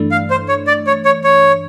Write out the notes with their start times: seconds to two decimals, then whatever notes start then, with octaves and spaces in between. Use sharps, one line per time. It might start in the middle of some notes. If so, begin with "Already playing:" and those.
Already playing: G2 E3 A3 D4
0.11 F5
0.30 C5
0.48 C#5
0.67 D5
0.87 C#5
1.05 C#5
1.24 C#5